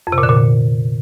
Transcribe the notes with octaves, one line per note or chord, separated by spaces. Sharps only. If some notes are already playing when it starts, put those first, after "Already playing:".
F2
C3
A#2
D3
A#2